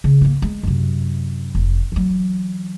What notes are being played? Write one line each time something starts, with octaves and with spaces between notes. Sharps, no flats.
C#3
A#3 C#4
G#3
F#2 C3
F1
E3 F#3